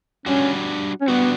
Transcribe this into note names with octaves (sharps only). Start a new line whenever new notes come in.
G3 C#4 D4 F#4
C#4
G3 B3 D4 F#4